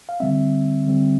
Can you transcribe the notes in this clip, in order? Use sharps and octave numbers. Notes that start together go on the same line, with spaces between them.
F5
D3 G3 C4 E5
D3 G3 C4